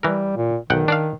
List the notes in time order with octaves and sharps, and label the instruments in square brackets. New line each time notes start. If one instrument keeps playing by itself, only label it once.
[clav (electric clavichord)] E3 A#4 [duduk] G3
[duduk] A#2
[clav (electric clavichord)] B1 F#5 G5 [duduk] D#3
[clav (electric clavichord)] D4 D5 F5